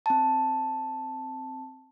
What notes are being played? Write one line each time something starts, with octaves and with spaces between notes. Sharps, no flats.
C4 A5